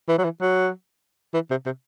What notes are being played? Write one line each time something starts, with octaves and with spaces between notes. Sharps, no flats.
E3
F#3
E3
F#3
E3
C3
C3